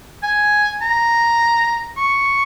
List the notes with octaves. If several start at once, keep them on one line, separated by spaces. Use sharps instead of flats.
G#5
A#5
C#6